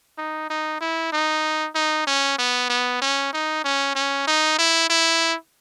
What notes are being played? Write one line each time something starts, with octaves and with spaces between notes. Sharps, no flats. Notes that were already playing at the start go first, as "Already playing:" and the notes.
D#4
D#4
E4
D#4
D#4
C#4
B3
B3
C#4
D#4
C#4
C#4
D#4
E4
E4